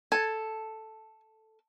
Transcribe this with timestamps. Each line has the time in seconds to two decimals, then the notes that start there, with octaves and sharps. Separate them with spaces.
0.12 A4 G#5 A5